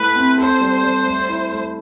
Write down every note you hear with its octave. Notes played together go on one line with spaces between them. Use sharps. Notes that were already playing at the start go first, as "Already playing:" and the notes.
Already playing: A3 E4 B4
C4
A4 C5
G3
G3
A3
E4
A3